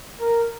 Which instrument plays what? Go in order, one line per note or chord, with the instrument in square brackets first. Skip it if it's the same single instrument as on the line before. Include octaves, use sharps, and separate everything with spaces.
[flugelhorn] A#4